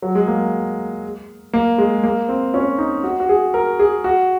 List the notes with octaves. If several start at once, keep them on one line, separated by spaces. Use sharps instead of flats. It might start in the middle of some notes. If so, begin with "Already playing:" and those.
F#3
G#3
A#3
A#3
G#3
A#3
C4
C#4
D#4
F#4
F#4
G#4
A#4
G#4
F#4